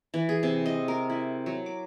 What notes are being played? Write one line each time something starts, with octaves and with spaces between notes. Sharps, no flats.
E3
G#4
C3
D#5
A#4
E4
F#3
D6